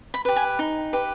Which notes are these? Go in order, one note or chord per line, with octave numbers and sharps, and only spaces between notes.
B5
G4 B4
G#5
D#4
G4 B4